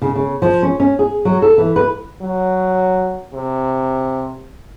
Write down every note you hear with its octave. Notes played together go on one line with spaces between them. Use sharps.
C#3
C#3
F3
C#4
C#4
G#4
F#3
A4
E3
B4
F#3
C3